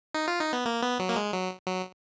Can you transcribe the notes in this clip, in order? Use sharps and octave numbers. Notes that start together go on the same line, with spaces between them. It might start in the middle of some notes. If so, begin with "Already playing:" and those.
D#4
F4
D#4
B3
A#3
B3
F#3
A#3
G#3
F#3
F#3